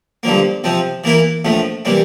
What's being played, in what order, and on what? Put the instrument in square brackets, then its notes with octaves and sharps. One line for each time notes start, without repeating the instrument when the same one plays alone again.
[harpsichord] G2 D3 F3 A#3
C3 F3 C4
E3 A#3 E4 A#4
A#1 A2 F3 A3
C3 E3 G3 A#3